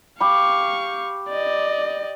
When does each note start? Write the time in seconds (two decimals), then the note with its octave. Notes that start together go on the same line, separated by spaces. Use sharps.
0.20 G4 F5 B5 C#6
1.29 D5 D#5